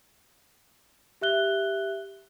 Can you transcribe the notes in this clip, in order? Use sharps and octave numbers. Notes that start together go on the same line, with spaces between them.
G4 E5 F#6 G7